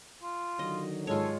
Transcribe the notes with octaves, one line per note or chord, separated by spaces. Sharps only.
F4
D3 D#3 F#3 D#5
G#2 G#3 F4 A4 C#5